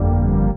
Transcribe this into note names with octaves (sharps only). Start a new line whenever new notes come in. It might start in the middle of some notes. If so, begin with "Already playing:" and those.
Already playing: G1 F2 D3 G3 A#3